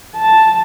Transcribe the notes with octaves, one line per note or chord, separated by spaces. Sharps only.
A5